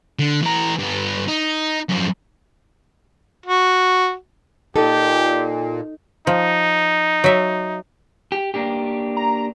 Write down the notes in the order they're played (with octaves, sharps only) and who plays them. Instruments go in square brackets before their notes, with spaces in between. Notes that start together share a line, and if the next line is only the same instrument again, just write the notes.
[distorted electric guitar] D3
E3 A#5
G2 B3
D#4
F#2 F3
[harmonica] F#4
[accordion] A#2 [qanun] D#4 [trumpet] G4 [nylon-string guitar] A4
[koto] F3 [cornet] D#4
[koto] F#3 E5
[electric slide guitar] G4
A#3 D4 G4
[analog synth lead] A#5